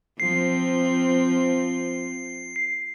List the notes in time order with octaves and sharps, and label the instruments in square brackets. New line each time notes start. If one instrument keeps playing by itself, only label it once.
[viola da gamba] F3 C4 [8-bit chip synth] C7